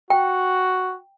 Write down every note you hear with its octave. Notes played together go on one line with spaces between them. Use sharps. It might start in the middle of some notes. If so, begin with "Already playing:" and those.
F#4 G5